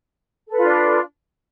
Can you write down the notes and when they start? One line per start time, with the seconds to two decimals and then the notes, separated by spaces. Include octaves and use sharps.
0.48 A4
0.52 B4
0.57 F4
0.62 D4